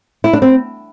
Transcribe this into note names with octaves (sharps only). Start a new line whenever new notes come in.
E4
D4
C4